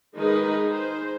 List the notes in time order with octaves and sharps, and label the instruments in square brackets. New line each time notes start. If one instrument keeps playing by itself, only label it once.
[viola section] D#3 G#3 D#4 G#4 A#4 B4
G#4 C5